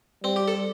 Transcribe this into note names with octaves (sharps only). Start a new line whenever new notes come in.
G3 C4
G4
A4